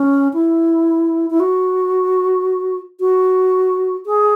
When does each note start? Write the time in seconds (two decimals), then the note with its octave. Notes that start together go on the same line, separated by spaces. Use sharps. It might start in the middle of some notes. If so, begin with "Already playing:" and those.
Already playing: C#4
0.34 E4
1.30 E4
1.40 F#4
3.00 F#4
4.06 G#4